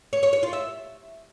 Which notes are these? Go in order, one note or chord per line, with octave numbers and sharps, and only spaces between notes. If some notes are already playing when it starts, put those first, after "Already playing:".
C#5
C#5
C#5
F4
E5